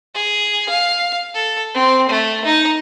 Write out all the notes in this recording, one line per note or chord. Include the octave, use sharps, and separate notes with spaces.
G#4
F5
A4
C4
A3
D#4